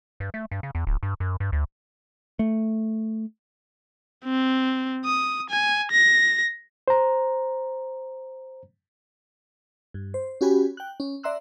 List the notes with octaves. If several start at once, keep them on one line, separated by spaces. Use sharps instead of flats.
G2
A3
G2
C#3
E2
D1
G2
F#2
G2
D2
A3
C4
D#6
G#5
A#6
C5 A#5
G2
C5
C#4 F#4 G4 G#5 B5
G5 F#6
C#4
D5 E5 A#5 C6 E6 F#6